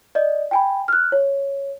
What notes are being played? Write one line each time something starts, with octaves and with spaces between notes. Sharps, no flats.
D5 D#5
G5 G#5 B5
F6 F#6
C#5